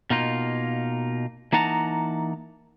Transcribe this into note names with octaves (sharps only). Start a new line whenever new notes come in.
B2 A#3 D#4 F4
E3 A#3 D#4 F#5 A5 A#5